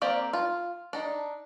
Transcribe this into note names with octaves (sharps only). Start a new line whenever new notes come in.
A#3 C4 G4 D5 F5
F4
D4 D#4